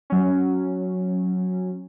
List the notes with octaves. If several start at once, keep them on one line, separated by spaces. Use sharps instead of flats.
F#3 C#4